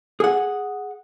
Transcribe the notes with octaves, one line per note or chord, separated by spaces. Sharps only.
G#4 F#5